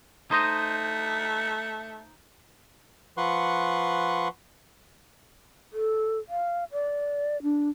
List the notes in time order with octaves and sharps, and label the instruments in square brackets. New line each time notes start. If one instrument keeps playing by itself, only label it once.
[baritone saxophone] A3 [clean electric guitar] D#4 C5 D#5
[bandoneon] F3 B4 F#5 C6 C#6
[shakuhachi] A4
F5
D5
D4